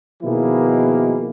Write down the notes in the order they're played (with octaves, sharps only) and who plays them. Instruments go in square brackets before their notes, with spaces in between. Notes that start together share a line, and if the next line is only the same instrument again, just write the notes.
[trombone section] B2 D#3 F3 A#3 E4 G#4